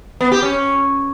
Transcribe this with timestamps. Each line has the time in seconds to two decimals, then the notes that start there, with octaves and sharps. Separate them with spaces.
0.21 B3
0.32 G4
0.43 C#4